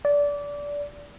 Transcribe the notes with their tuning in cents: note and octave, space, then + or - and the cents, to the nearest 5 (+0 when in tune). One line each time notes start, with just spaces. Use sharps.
D5 -20